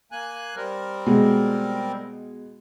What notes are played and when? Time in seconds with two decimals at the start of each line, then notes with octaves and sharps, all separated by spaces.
0.12 A#3 G#5 F#6
0.56 G3 C4 A#4
1.06 B2 G#3